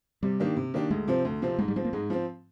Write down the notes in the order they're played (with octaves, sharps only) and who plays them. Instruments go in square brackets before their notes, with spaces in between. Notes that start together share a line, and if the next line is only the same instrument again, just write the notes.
[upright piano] C3 [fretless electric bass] G3
[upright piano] D#3 A#3 D4 G4
C3
D#3 A#3 D4 G4
[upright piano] D2 [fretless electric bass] G#3
[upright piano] C3 F3 C4
D2
C3 F3 C4
[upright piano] G#2 [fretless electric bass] G#3
[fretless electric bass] G3
[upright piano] F3 C4 [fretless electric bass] G#3
[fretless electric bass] A#3
[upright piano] G#2 [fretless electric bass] G#3
[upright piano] F3 C4